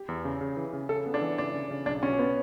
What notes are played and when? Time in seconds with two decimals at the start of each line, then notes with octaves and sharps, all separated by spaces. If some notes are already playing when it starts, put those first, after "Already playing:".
Already playing: G4
0.08 E2
0.25 C#3
0.41 C#3
0.57 E3
0.73 C#3
0.89 C#3 A4
1.06 B3
1.14 D4
1.21 E3
1.38 C#3 D4
1.54 C#3
1.71 C#3
1.86 B1 D4
2.03 B2 C#4
2.19 B3